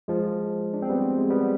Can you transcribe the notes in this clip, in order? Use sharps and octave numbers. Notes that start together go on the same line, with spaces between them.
F3 G#3
D4
C4
G3 B3
G#3
G3 B3